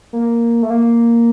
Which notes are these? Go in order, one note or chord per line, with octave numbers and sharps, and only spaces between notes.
A#3
A3
A#3